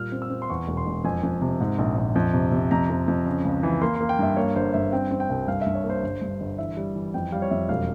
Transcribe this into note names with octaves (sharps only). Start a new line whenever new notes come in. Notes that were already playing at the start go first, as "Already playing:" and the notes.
Already playing: A#2 G3 F6
C4
E6
C4
C6
E2 C#6
E1
C6
E1
F2 G#5
F2
C3
G#2
A#1
A#1
F2
C3
C3
F2 A#5
F2
F2
C#3
C#2
E3
A#3 C6
C6
A#3
G5
G2 E5
A#3 C#5
G1 C5
G2 E5
C4 G5
C4
G5
C2
G2 F5
E5
G2
C#5
A#3
C5
G1
G2
G1
E3 E5
G3
E3
F2 G5
G3 F5
C#5
F2 E5
E1 F5